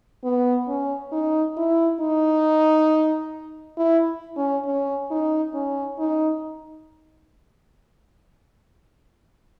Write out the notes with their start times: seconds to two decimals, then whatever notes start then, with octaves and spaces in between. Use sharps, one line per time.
0.24 B3
0.68 C#4
1.12 D#4
1.57 E4
2.00 D#4
3.77 E4
4.36 C#4
4.66 C#4
5.11 D#4
5.54 C#4
5.99 D#4